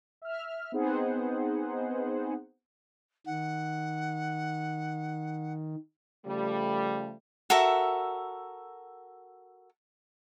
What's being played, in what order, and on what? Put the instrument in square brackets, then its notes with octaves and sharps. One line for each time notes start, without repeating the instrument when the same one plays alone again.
[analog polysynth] E5 F6
B3 C4 D#4 G#4 C5 F#5
[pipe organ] D#3 [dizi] F#5
[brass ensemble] C#3 F3 A3 [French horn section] G3
[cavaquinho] F#4 A4 A#4 E5